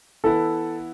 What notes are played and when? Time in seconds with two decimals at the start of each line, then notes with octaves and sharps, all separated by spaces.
0.24 E3 B3 E4 A4